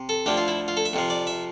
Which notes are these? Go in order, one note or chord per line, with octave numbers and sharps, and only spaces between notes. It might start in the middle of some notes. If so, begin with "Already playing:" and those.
Already playing: C3
A4
D2 D3 F3 G4
F4
E4
F4
A4
E5
F2 C3 F3
D5
E5